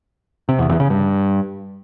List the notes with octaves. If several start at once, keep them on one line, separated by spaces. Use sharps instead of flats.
C3
E2
E2
C#3
G2